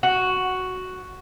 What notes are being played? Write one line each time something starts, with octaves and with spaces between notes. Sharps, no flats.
F#4